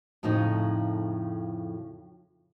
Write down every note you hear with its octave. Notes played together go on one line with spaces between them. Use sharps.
F2 A2 C#3 F3 D#4